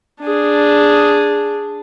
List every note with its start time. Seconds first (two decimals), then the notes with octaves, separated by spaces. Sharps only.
0.21 D4 G#4